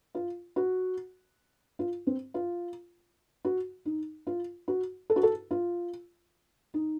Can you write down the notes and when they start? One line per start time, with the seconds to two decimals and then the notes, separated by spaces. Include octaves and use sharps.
0.15 F4
0.56 F#4
1.79 F4
2.07 C4
2.34 F4
3.45 F#4
3.85 D#4
4.27 F4
4.68 F#4
5.10 A4
5.16 F#4
5.23 A4
5.51 F4
6.74 D#4